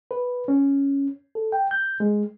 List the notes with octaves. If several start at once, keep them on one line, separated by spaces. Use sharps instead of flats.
B4
C#4
A4
G5
G6
G#3